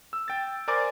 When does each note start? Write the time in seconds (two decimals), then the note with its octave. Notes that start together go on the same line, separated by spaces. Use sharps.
0.13 E6
0.28 G5 A6
0.68 A#4 C5 D5 G#5 D6 A6